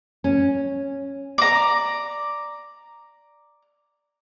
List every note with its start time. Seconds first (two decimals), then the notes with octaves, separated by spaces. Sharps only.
0.24 C#4
1.38 D5 A#5